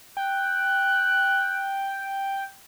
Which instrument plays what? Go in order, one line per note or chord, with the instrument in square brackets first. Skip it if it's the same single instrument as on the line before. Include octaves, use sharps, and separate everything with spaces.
[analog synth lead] G5 [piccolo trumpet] F#6